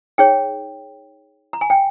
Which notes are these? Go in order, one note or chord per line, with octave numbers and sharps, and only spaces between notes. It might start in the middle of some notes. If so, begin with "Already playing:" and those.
D#4 G#4 C#5 G5
A#5
G#5
G5